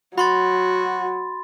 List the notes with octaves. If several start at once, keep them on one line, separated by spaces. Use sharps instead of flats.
F#3 F#4 B5 C6 A6